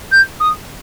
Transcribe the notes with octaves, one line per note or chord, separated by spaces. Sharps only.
G6
D#6